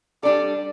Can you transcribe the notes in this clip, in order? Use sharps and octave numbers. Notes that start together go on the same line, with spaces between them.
G3 D4 A4 D5